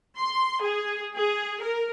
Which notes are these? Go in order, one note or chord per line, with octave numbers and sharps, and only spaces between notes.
C6
G#4
G#4
A#4